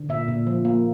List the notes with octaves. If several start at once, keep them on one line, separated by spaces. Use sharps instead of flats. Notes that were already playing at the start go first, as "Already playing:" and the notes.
Already playing: D3
A#2 E5
A#2
F3
A#3